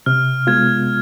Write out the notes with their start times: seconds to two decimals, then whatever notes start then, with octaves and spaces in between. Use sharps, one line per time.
0.06 C3 F6
0.47 G#3 B3 F4 G#6